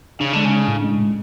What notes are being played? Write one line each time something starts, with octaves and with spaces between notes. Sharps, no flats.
C#3 D4
D3 G#3
C#3
D4
A2
G#3
A2